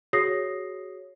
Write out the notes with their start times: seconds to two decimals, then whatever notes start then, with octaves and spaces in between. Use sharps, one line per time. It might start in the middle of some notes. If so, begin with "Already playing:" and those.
0.13 F#4 G#4 C#5 D#6 A#6 C7